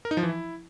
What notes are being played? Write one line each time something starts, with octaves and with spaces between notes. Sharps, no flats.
A#4
D#4
F3
E3
E4